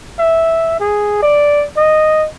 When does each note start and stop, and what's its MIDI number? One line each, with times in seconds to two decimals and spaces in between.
0.19 0.79 76
0.80 1.18 68
1.22 1.66 74
1.77 2.27 75